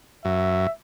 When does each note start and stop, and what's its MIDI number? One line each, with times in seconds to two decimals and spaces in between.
0.25 0.67 42
0.25 0.71 76